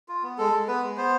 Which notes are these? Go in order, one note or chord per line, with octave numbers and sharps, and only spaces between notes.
F4
B3
G#3 A4
G#3
B3 B4
G#3
B3 C5